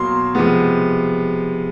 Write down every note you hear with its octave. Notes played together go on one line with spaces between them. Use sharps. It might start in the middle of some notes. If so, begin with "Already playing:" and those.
Already playing: B2 F#3 A#3 C6
C3 F3 G#3 B3